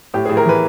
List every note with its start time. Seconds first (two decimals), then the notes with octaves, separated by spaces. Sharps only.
0.14 A2 G4
0.26 A2 G#4
0.37 A#4
0.45 E3 B4